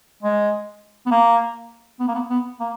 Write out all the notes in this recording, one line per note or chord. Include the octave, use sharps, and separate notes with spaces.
G#3
B3
A#3
B3
A#3
B3
B3
A#3